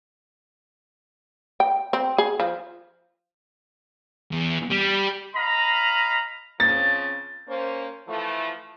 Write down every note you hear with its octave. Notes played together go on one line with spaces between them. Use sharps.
G5
C4
G#4
F3
E2
G3
D#5 F5 A#5 B5
C#3 F3 C4 A6
A#3 C#4 C5
E3 F3 A3